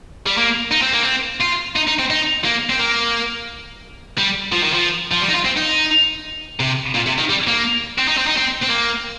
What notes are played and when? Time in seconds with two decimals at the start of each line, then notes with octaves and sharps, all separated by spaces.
0.26 G3
0.37 A#3
0.71 D#4
0.82 C4
0.93 A#3
1.03 C4
1.41 F4
1.76 D#4
1.88 D#4
1.99 C4
2.10 D#4
2.45 A#3
2.70 C4
2.80 A#3
4.18 G3
4.52 F3
4.63 D#3
4.73 F3
5.11 F3
5.22 G3
5.29 D#4
5.34 F4
5.45 C4
5.57 D#4
6.60 C3
6.94 A#2
7.06 C3
7.18 D#3
7.29 G3
7.47 A#3
7.98 C4
8.08 D#4
8.17 C4
8.27 D#4
8.37 C4
8.62 C4
8.68 A#3